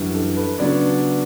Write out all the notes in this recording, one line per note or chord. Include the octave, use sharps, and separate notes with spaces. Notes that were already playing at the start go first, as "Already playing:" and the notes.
Already playing: F#2 E3 G3 D4
A4
B4
C#3 F#3 B3 D4 D5